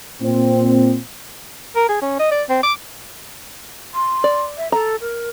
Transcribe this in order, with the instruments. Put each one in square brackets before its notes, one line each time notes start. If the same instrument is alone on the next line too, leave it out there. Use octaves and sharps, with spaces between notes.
[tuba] A#2 [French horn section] C4
[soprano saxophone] A#4
G#4
C#4
D#5
D5
C4
D6
[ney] C6
[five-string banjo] D5
[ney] E5
[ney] A4 [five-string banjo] A#5
[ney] A#4